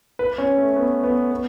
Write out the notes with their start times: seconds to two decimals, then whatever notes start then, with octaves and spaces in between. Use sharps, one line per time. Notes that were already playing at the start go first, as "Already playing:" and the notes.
0.19 B4
0.38 C#4
0.57 A3
0.76 B3
1.04 B3
1.32 B3